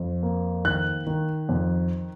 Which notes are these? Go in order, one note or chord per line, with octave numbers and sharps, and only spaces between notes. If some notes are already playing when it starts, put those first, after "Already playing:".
Already playing: F2
A#3
D#3 F#6
D#3
F2